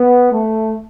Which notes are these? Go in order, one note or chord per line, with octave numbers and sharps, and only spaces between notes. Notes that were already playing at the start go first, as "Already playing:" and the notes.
Already playing: B3
A3